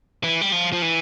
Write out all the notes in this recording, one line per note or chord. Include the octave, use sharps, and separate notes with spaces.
E3
G3
F3
F3
E3